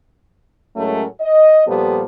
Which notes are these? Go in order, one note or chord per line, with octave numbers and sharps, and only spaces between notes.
A2 F#3 G#3 A3 C#4 A#4
D#5
A#2 F3 G3 B3 G4 A4